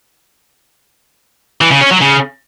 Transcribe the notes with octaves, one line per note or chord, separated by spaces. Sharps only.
E3
C#3
C#4
F#3
C#3